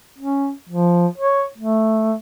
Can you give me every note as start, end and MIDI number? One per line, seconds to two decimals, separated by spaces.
0.18 0.51 61
0.69 1.07 53
1.18 1.44 73
1.58 2.14 57